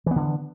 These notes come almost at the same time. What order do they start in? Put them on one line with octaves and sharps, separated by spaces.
E3 B3 D3